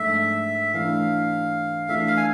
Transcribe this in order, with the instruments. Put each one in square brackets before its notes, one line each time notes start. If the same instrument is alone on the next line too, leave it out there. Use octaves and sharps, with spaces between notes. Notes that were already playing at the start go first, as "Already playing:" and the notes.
Already playing: [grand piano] G#2 F3 A3 D4 [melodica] E5
[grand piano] E3 A3 D4 [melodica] F5
[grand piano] E3 A3 D4 F4 [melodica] E5
[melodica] F5
G#5